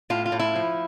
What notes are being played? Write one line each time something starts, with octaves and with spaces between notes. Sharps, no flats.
A2 F4
F4
A2
E4
F3